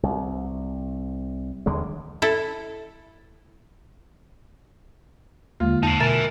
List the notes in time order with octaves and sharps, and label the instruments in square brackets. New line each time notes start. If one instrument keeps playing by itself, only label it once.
[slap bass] C2
D#2 D3 G3 G#3
[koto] E4 A4
[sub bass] D#2 [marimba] D3 G#3 A#3 [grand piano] F4
[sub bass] E2 [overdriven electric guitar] D#4 C5 [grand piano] A5
[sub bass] B2 [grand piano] A#4 [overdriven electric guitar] E5 G#5 [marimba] A6